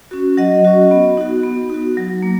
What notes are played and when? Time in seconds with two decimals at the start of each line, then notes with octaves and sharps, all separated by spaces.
0.11 C#4 F#4
0.37 F#3 D#5 F#5
0.64 C#4 F#4
0.91 B3
1.17 D#4 F#4
1.44 B3
1.70 D#4 F#4
1.97 F#3
2.22 A#3